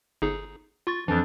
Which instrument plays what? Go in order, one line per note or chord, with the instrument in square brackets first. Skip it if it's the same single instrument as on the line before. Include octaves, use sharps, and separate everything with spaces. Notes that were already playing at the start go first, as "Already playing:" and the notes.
[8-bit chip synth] G1 D#4 G#4
F4 C#6 A6
[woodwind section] F2 F3 D4 [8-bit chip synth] E3